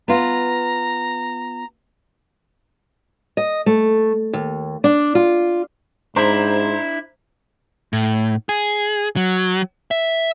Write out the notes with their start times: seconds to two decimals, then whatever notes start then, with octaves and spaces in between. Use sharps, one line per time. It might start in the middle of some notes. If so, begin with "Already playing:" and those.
0.08 B3 F4 A#5
3.37 D#5
3.66 A3
4.33 D#2
4.84 D4
5.15 F4
6.16 G#2 D4 E4 C5 A#5
7.93 A2
8.49 G#4
9.16 F#3
9.91 E5